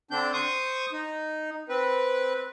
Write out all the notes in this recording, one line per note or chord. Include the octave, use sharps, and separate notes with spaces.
D3 C4 D4 G6
C5 C#6 D#6
D#4
C4 B4